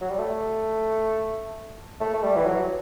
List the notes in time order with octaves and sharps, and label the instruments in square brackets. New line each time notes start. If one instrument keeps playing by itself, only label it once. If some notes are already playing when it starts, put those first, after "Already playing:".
[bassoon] F#3
G3
A3
A3
A3
G3
E3
F#3